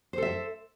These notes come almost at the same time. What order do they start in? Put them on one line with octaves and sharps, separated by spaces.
C5 A4 E5